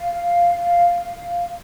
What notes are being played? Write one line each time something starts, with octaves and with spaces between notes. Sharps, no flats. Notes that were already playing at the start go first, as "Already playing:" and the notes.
Already playing: F5